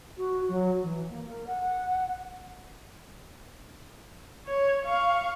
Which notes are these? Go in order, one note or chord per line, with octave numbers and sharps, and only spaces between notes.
F#4
F#3
E3
A#3
A#4
F#5
C#5
F5 C#6